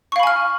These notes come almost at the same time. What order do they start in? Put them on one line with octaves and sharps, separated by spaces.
C#6 F5 B5 G#5 F6